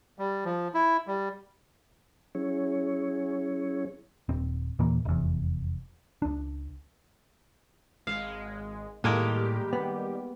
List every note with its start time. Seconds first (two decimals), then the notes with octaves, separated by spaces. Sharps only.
0.19 G3
0.45 F3
0.74 E4
1.07 G3
2.35 F#3 C#4 E4 G#4 C#5
4.29 D#1 C4
4.79 D#2 A#2 E3 A#3
5.05 F1 E2
6.22 C#2 D4
8.07 G#1 G#3 F5
9.04 A2 D#3 G3 G#3 A#3 G4 A#4
9.73 B3